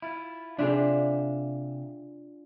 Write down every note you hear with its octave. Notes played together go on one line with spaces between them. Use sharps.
E4 F4
C3 D4 F4 G#4 E5 C6